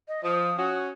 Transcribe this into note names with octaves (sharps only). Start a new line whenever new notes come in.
D#5
F3 D#6
C#4 F#4